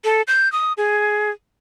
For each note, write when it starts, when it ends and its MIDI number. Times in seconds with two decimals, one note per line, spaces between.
0.04 0.22 69
0.28 0.51 91
0.52 0.73 87
0.77 1.31 68